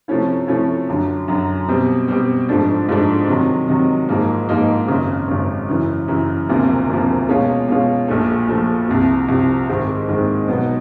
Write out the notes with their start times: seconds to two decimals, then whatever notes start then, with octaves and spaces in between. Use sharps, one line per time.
0.08 C3 F3 A3 C#4 E4
0.48 C3 F3 A3 C#4 E4
0.88 F#2 D3 F#3
1.28 F#2 D3 F#3
1.68 B2 G3 C4
2.08 B2 G3 C4
2.49 G#2 F3 A3 D4
2.89 G#2 F3 A3 D4
3.28 C3 D#3 F#3
3.68 C3 D#3 F#3
4.08 G#2 F3 A#3 D#4
4.49 G#2 F3 A#3 D#4
4.88 G#1 F#2 C#3
5.28 G#1 F#2 C#3
5.68 F#2 C#3 E3
6.08 F#2 C#3 E3
6.48 E1 D2 C3 F3 A#3
6.89 E1 D2 C3 F3 A#3
7.28 B2 G#3 C#4 F4
7.68 B2 G#3 C#4 F4
8.08 A#1 A#2 F3 A3
8.48 A#1 A#2 F3 A3
8.89 C2 C3 F3
9.28 C2 C3 F3
9.68 G#2 D#3 G#3 C4
10.09 G#2 D#3 G#3 C4
10.48 B2 F#3 B3 D#4